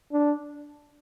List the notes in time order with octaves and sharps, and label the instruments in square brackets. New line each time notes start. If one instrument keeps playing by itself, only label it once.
[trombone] D4